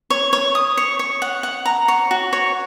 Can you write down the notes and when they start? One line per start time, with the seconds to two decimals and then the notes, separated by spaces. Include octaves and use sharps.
0.10 C#5
0.33 C#5
0.55 D#6
0.77 C#5
0.99 C#5
1.22 F#5
1.43 F#5
1.66 A#5
1.88 C#5
2.11 F#4
2.33 C#5